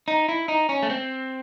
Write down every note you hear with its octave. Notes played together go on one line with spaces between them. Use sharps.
D#4
E4
D#4
C#4
A3
C4